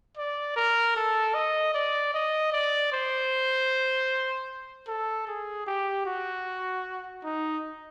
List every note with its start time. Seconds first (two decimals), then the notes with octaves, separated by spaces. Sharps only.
0.18 D5
0.57 A#4
0.97 A4
1.35 D#5
1.75 D5
2.14 D#5
2.52 D5
2.93 C5
4.88 A4
5.27 G#4
5.67 G4
6.06 F#4
7.24 D#4